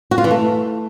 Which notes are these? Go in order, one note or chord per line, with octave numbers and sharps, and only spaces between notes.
F#4
F4
E3
A3